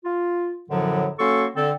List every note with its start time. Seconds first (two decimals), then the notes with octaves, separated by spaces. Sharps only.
0.05 F4
0.70 F#2 A2 D3 F3 F#3
1.19 F#3 A#3 C#4 A4 C6 C#6
1.56 D3 C4 A4